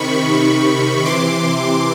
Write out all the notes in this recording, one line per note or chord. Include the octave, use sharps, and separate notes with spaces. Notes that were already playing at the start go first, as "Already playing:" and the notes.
Already playing: C3 D#3 B5 C#6
C3 D#3
C3 E3 C6 D6